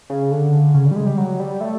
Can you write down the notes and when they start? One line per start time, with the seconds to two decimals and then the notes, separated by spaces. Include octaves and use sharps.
0.10 C#3
0.31 D3
0.74 C#3
0.85 D3
0.91 G3
0.96 G#3
1.06 G3
1.18 F#3
1.40 G3
1.61 A3